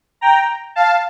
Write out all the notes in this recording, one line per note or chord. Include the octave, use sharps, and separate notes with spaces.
G5 A#5
F5 A5